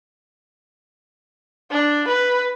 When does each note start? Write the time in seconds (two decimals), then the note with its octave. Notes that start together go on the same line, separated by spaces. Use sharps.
1.71 D4
2.08 B4